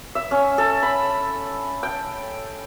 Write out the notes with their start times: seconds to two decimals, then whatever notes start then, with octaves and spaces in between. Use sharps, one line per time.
0.15 E5
0.31 C#4
0.58 A4
0.83 B5
1.83 G5